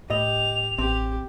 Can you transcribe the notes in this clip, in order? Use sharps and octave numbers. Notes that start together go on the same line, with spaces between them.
A2 G4 D#5 F7
A1 C4 G4